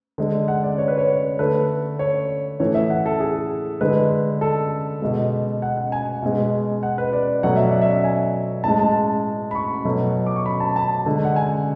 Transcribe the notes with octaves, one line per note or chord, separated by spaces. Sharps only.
D3 G#3
F#5
D5
C#5
B4
C#5
D3 A3 B4
C#5
A2 E3 A3 C#5
E5
F#5
A4
G#4
D3 G#3 B4
A4
B2 G#3
F#5
F#5
G#5
B2 G#3
F#5
B4
D5
B2 F#3 A3 F#5
E5
D5
E5
G#5
A2 G#3 A5
A5
B5
C#6
B2 F#3 A3
D6
C#6
B5
A5
A5
D3 G#3
F#5
G#5